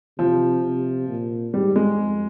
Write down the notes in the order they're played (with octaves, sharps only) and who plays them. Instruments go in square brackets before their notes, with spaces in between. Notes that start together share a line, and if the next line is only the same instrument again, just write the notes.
[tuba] C3 [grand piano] F3
[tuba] C3
A#2
[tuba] G#2 [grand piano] G3
[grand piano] G#3
[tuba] F2